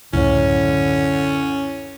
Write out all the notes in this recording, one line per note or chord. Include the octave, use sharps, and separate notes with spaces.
C#2 F#2 A2 D3 C#4 E4 C#5